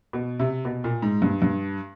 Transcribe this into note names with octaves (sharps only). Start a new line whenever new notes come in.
B2
C3
B2
A#2
G#2
G2
G2